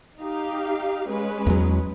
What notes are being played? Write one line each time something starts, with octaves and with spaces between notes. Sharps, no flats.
D#4 G4 F5
G#3 C#4 B4
E2 F#3